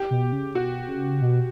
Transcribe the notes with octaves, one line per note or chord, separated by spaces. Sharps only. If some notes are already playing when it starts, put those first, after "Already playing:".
Already playing: G4
B2
C#3
B2 F#4
C#3
B2